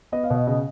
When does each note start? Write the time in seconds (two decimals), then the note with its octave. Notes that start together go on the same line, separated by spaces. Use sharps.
0.12 B3 D#5
0.23 F5
0.30 B2 D#5
0.47 C#3 D#5